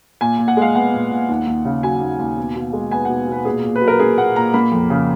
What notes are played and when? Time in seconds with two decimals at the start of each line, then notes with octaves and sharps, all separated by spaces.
0.21 A#2 G#5
0.39 A#2
0.48 F#5
0.57 G#3 F5
0.75 B3 F#5
0.93 A#2
1.11 A#2
1.29 D#2
1.47 D#2
1.65 C#3
1.83 F#3 G#5
2.01 D#2
2.19 D#2
2.38 B2
2.56 B2
2.73 G#3
2.91 B3 G#5
3.05 B2 F#5
3.28 B2 B4
3.45 A#2 G#4
3.63 A#2
3.76 B4
3.81 F#3
3.88 A#4
3.99 A#3 G#4
4.18 A#2 F#5
4.36 A#2 A#5
4.54 A#3 B5
4.72 F2
4.90 C#3